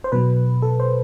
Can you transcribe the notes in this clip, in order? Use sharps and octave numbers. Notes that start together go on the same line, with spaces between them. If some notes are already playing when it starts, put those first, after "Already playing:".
C5
B2 F#3 B4
A4
C5